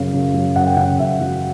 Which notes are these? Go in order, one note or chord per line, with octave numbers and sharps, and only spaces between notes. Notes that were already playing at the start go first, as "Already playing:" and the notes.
Already playing: F#2 C#3 F5
F#2
F#3
F#2 F#5
G5
C#3 F#5
F#2 E5
F#3